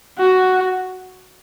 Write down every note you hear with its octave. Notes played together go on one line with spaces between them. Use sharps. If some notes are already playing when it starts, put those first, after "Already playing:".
F#4